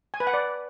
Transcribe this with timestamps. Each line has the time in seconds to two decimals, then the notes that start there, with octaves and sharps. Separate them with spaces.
0.14 G#5
0.20 B4
0.27 F#5
0.34 D5